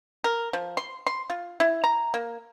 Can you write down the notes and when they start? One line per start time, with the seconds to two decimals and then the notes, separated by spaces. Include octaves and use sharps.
0.24 A#4
0.53 F3
0.77 C6
1.07 C6
1.30 F4
1.60 E4
1.84 A#5
2.14 A#3